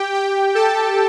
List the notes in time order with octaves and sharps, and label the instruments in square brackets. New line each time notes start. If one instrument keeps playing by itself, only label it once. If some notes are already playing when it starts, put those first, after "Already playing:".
Already playing: [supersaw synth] G4 G5
G4 G5
A4 A5